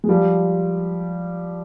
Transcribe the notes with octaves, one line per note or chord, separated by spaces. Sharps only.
G#3
F3 G3